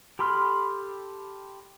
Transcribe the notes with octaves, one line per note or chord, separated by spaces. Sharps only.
G4 A4 B5 C6 F6